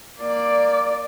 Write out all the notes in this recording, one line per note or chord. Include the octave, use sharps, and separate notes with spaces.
A#3 D5